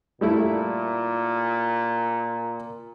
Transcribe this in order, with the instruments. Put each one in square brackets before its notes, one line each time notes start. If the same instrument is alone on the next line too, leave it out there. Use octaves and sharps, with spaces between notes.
[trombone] A#2 [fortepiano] G3 A3 E4